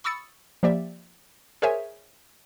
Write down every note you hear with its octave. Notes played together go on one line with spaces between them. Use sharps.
B5 C#6 D#6 E6 A6 C#7
F3 A#3 G4 D5 E5
G#4 A#4 C5 C#5 E5 G#5